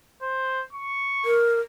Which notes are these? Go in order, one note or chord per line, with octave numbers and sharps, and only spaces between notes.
C5
C#6
A#4